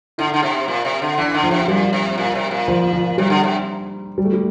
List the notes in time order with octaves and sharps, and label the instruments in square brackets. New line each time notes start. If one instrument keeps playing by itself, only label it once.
[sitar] D3 [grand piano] E4
[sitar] D3
C3
A#2
C3
D3
[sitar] E3 [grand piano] D4
[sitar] D3
[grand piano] F3
[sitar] C3
[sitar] A#2 [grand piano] G3
[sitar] C3
A#2
C3
A#2
[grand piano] F3
F3
[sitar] C3 [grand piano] G3
[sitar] D3
C3
[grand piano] G3
A3
G3